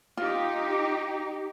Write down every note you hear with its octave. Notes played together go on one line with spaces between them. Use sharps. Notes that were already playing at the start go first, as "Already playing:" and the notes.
D#4 F4 G4